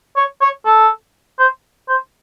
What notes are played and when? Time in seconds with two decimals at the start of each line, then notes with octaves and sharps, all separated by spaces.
0.16 C#5
0.41 C#5
0.65 A4
1.39 C5
1.89 C5